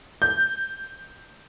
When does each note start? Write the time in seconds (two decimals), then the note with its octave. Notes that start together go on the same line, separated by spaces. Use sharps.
0.22 G6